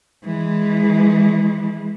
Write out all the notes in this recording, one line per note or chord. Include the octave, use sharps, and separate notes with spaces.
E3 G#3